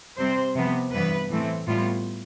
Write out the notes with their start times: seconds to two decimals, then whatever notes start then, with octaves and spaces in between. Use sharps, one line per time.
0.17 C3 G3 C4 C5
0.55 C3 F3 B3
0.92 G2 E3 B3 B4
1.30 A2 E3 A3 C4
1.67 A2 G3 B3 F4